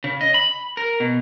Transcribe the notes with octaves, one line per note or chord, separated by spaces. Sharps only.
C#3
D#5
B5
A#4
B2